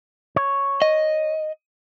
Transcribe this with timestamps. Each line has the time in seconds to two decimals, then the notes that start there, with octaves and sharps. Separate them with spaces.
0.36 C#5
0.82 D#5